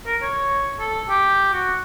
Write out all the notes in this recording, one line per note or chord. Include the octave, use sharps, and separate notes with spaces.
A#4
C#5
A4
G4
F#4